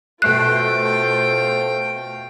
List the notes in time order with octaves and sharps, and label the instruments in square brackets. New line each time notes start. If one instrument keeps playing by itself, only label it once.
[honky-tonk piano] B2 A3 C7 [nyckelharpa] F4 G5 [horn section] A4 C5 [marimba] F#6